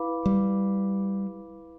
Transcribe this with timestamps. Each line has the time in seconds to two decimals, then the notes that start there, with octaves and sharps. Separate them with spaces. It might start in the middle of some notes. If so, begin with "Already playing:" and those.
Already playing: E4 B4 F5 B5 D6
0.26 G3